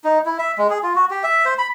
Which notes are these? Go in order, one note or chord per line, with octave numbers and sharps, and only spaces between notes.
D#4
E4
E5
G#3
G#4
F4
F#4
G4
E5
C5
B5